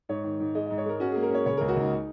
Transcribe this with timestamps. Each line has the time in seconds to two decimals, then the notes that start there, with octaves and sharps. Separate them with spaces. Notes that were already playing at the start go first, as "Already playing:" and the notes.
0.09 G#2 C#5
0.24 D#3
0.40 G#2
0.55 G#3 D#5
0.66 G#2 D#5
0.78 C#5
0.86 G#3 A#4
1.00 C#4 F#4
1.12 A#3 G#4
1.23 A#4
1.30 C#4 C#5
1.46 C#3 C#5
1.57 C#2 A#4
1.68 F#4
1.76 C#2 D#4